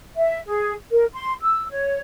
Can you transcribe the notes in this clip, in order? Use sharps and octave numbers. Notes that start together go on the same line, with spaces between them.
E5
G#4
A#4
C6
E6
C#5